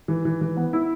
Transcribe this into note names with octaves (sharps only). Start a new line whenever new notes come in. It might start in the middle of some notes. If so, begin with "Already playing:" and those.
E3
E3
E3
B3
E4